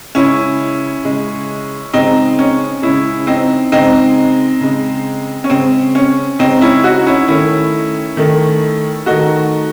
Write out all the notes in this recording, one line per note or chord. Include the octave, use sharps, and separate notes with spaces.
C#3 G#3 C#4 E4
C#3 G#3
C#3 G#3 C4 D#4
C#4
C#3 G#3 C#4 E4
C4 D#4
C#3 G#3 C4 D#4
C#3 G#3
C#4
C#3 G#3 C4
C#4
C#3 G#3 C4 D#4
C#4 E4
D#4 F#4
C#4 E4
D#3 A3 C#4 E4
D#3 A3
D#3 A3 D#4 F#4